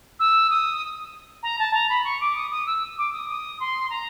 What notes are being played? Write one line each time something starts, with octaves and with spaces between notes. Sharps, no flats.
E6
D#6
A#5
A5
A#5
B5
C#6
D6
D#6
D#6
E6
D6
D#6
D#6
C6
A#5